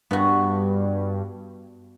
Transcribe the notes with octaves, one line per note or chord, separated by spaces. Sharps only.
G2 B3 F#4